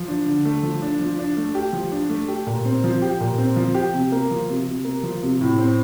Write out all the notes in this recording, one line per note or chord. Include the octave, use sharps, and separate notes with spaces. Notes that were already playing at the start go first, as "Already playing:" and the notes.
Already playing: F3
D4
D3
A3
F3
D4
F3
D4
A3
G4
F3
D4
A3
G4
A#2
C4
F3
G4
A#2
C4
F3
G4
C3
A#3
F3
C3
C3
A#3
F3
C3
A2
C4